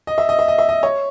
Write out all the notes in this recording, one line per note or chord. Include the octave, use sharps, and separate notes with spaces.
D#5
E5
D#5
E5
D#5
E5
D#5
C#5